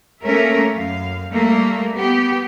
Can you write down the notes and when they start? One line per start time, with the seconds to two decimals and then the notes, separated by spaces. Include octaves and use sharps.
0.23 A3 A#3 C#4 A#4 E5
0.74 F#2 F5
1.33 G3 A3 A#3
1.95 B3 G4